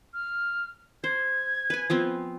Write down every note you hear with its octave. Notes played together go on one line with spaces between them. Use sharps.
F6
C5 G#6
B4 G#5
F3 B3 C4